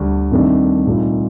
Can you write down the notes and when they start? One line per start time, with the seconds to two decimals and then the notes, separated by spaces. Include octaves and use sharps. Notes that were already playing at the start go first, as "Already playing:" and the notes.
Already playing: D2 D3 G3
0.31 C2 C3 D#3 A3 D4
0.87 C2 A#2 A3 D#4